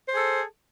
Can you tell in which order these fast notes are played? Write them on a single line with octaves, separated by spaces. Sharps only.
C5 G#4 A4